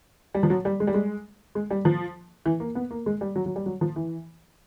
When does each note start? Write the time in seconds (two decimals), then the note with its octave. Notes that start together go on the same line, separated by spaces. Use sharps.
0.34 G3
0.43 F3
0.50 F#3
0.65 G3
0.80 G#3
0.87 G3
0.94 G#3
1.55 G#3
1.70 G3
1.85 F3
2.46 E3
2.60 A#3
2.75 B3
2.91 A#3
3.06 G#3
3.21 G3
3.36 F#3
3.46 F#3
3.56 G3
3.66 F#3
3.81 F3
3.96 E3